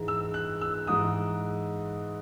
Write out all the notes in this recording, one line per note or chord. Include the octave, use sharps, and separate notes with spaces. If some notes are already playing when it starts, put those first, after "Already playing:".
Already playing: G#2 E3 G#3
E6
F#6
E6
G#2 E3 G#3 D#6